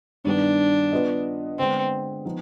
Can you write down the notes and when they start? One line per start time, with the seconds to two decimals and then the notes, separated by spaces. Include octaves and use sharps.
0.24 G2 D#3 G3 B3 D4
0.92 B3 F4 B4 D#5
1.58 D3 G#3 B3 C4
2.25 F3 B3 D#4